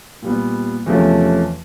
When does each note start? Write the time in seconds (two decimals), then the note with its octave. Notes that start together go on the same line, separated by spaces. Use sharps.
0.22 A#2 G3 B3
0.86 E2 C3 F3 A3 C#4